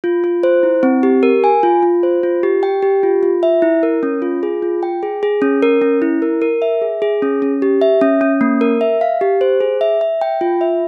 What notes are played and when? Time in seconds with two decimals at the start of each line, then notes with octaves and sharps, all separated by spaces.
0.04 F4
0.24 F4
0.43 C5
0.63 E4
0.83 C4
1.03 G4
1.23 A#4
1.44 G#5
1.63 F4
1.83 F4
2.03 C5
2.23 F4
2.43 G4
2.63 G5
2.82 G4
3.03 F4
3.23 F4
3.43 E5
3.62 E4
3.83 A#4
4.03 C#4
4.22 F4
4.43 G#4
4.62 F4
4.83 G5
5.03 G#4
5.23 G#4
5.42 C#4
5.62 A#4
5.82 C#4
6.02 E4
6.22 A#4
6.42 A#4
6.62 E5
6.82 G#4
7.02 G#4
7.22 C#4
7.42 C#4
7.62 G4
7.82 E5
8.01 C#4
8.21 C#4
8.41 A#3
8.61 A#4
8.81 E5
9.01 F5
9.21 G4
9.41 C5
9.61 G#4
9.81 E5
10.01 E5
10.21 G5
10.41 F4
10.61 E5